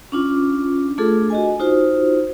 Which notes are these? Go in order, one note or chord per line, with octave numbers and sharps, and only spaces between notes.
C#4 D4 F4
A3 D4 F4 G#4 A4
F#4 D#5 G#5
D#4 F4 F#4 C5